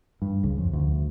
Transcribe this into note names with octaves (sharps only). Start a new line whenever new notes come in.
G2
C#2
F2
D2